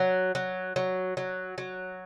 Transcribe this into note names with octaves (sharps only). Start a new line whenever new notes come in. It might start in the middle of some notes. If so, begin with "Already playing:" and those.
Already playing: F#3
F#3
F#3
F#3
F#3